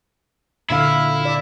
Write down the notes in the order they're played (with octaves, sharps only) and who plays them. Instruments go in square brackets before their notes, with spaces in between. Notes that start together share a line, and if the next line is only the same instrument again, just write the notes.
[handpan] A#2 D3 F5 [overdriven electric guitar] E4
[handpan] D5